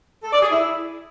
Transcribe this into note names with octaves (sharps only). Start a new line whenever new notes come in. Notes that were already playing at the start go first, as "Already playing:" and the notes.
A4
D5
G#4
E4